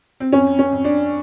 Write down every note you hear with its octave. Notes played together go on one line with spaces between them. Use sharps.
C4
F2 C#4
C#4
F2
D4